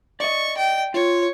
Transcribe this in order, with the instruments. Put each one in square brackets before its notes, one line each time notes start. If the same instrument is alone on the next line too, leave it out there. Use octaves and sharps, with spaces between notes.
[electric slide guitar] D5 D#5 [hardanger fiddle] C#6
[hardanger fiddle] G5
[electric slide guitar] F4 [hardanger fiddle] C#5